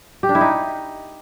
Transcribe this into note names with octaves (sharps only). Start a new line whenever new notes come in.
G4
D4
E4
D#4